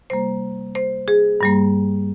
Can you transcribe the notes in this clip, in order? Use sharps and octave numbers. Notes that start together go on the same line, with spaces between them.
C3 G3 A#3 C5
C5
G#4
G2 G3 A#3